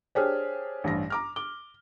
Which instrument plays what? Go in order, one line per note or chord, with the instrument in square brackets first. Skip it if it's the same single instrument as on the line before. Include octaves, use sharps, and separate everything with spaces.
[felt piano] D4 G4 G#4 [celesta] C5 C#5 F6
[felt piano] A1 G2 A#6
A#5 D6 F6
[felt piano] D6 [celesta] G7